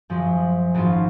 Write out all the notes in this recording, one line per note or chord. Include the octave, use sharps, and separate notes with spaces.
F#2 F3 G#3
G#1 G#2 F#3 C#4 F4